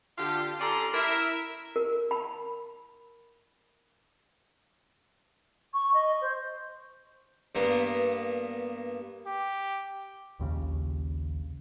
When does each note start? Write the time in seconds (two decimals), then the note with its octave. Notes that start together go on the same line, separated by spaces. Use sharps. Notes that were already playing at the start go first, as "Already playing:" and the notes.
0.18 D3 F4 G4
0.60 C#4 G4 A4 D5 A#5 C6
0.94 E4 A#4 E5
1.76 A#4
2.11 B5
5.74 C#6
5.94 D#5
6.21 C5
7.55 G2 A#3 B3
9.26 G4
10.39 A#1 D#2 C#3